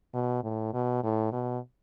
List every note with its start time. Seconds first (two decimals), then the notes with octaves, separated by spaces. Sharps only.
0.14 B2
0.44 A2
0.74 B2
1.04 A2
1.32 B2